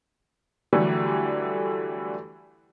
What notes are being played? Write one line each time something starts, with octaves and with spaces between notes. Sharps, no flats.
D3 E3 F#3 G3 A3